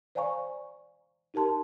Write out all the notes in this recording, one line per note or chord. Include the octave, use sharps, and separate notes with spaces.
C5 D5 F5 G#5 A#5 C#6
D#4 G4 A#4 A5 C6